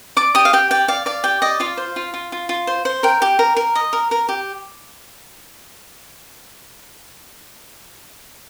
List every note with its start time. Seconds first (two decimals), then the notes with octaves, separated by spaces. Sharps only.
0.17 D5 D6
0.35 G4 D#6
0.45 F5
0.53 G4 G5
0.71 D5 G5
0.88 D5 F5
1.06 D5 F5
1.24 G4 G5
1.42 D5 D#5
1.60 F4 F5
1.77 C5
1.96 F4
2.14 F4
2.32 F4
2.49 F4
2.67 C5
2.85 C5
3.03 A#4 G5
3.22 G4
3.39 A#4
3.57 A#4
3.75 D#5
3.93 A#4
4.11 A#4
4.29 G4